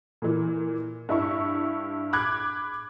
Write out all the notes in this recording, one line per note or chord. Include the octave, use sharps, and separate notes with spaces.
A#2 E3
G2 E4 C#6
B5 D6 F#6 G#6